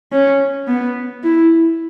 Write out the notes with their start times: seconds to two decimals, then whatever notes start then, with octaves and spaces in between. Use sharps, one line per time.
0.12 C#4
0.68 B3
1.24 E4